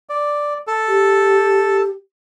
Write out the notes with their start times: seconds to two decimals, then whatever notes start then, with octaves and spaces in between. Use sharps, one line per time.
0.09 D5
0.67 A4
0.88 G4